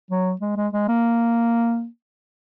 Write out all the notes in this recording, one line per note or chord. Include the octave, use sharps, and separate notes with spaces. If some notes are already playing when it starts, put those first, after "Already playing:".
F#3
G#3
G#3
G#3
A#3